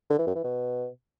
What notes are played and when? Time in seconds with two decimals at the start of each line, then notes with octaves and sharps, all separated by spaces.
0.10 D3
0.19 E3
0.27 F#2
0.36 E3
0.44 B2